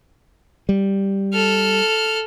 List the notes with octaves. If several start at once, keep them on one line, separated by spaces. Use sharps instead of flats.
G3
A4 F6